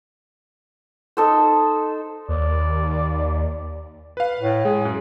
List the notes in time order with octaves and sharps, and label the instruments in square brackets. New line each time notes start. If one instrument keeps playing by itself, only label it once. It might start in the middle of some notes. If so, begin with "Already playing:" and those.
[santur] D#4 A4 C5
[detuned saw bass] D#2 [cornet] D5
[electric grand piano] B4 F5
[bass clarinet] A2
[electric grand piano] G#3 [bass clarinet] G#4
[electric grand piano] F#2